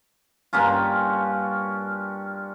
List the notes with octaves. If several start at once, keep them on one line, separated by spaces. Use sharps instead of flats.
G2 A#3 C#4 F4